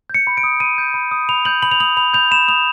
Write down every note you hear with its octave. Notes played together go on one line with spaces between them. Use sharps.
G6 C#7
B5
D7
D#6
B5 D#7
G6
B5
D#6
B5 F7
G6 F#7
B5 F#7
F7
D#6 F#7
B5 F7
G6 F7
B5 E7
D#6 F7